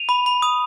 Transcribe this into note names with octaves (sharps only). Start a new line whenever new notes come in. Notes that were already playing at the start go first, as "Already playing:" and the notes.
Already playing: D#7 F7
B5
B5
D#6